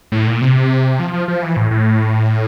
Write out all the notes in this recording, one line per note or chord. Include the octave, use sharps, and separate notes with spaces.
A2
A#2
C3
F3
F3
F3
E3
A2
A2